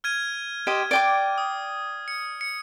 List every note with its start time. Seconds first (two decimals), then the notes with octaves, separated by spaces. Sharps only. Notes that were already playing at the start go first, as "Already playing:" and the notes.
0.04 F6 G#6 D#7
0.67 G4 C5 D#5
0.91 D5 G5 D6
1.38 D#6
2.08 C#7
2.41 C#7